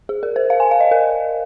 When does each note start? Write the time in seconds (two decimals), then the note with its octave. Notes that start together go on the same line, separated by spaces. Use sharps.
0.09 G#4
0.23 A#4
0.36 C5
0.50 F5
0.60 G#5
0.71 F5
0.81 D#5
0.91 A#4